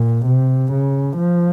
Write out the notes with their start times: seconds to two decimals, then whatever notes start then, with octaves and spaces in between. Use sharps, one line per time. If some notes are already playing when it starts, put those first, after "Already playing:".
Already playing: A#2
0.26 C3
0.72 C#3
1.17 F3